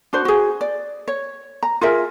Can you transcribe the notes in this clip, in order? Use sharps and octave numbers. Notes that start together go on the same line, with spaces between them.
D4 F#4 C5
F#4 G#4
D5
C#5
A#5
F4 G#4 A#4 E5